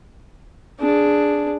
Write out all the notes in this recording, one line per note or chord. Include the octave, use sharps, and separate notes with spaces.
D4 G#4